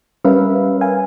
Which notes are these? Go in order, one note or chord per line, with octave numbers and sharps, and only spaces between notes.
G3 C#4 A#4 B4 E5 F5
F5 G#5